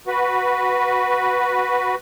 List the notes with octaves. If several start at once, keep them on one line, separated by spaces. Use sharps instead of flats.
F#4 B4